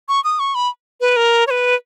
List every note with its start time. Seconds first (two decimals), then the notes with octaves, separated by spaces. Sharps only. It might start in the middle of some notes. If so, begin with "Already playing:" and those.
0.09 C#6
0.24 D#6
0.39 C#6
0.55 B5
1.01 B4
1.16 A#4
1.47 C#5
1.50 B4